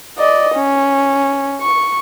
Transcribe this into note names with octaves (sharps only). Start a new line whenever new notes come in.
D5 D#5
C#4
C#6